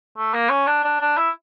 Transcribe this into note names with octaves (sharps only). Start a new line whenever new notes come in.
A3
A#3
C#4
D4
D4
D4
E4